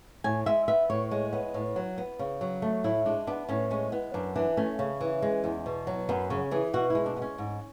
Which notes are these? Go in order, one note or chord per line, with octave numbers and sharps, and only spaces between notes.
A2 G#5
G#3 E5
B3 E5
A2 C#5
G#3
B3
A2
F#3
B3
C#3
F#3
A3
A2 E4
G#3 D4
B3 D4
A2 C#4
G#3 C#4
B3
F#2 D4
E3 D4
A3 C#4
C#3
E3
G#3
E2
B2
F#3
F#2 B3
C#3 C#4
E3 G#4
B2 F#4
G#3 E4
D4
B3
C#4
G#2